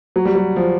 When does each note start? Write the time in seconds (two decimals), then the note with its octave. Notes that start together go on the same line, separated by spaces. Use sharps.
0.16 F#3
0.25 G3
0.35 F#3
0.56 F3